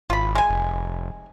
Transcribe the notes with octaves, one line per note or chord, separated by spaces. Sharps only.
G#1 F4 B5
G#3 G#5
F1